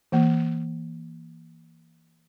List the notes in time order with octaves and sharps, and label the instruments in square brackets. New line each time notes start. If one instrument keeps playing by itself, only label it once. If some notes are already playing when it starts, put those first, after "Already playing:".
[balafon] E3 A#3